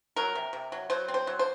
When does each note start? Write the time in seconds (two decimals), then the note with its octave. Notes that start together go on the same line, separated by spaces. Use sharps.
0.16 F#3 A#4
0.35 C3
0.53 C3
0.72 F#3
0.90 F#3 C5
1.08 C4
1.14 C5
1.27 F#3
1.39 C5